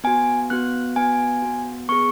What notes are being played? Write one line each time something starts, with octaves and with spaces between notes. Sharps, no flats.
B3 F#4 G#5
B3 F#4 F#6
B3 F#4 G#5
B3 F#4
B3 G#4 C#6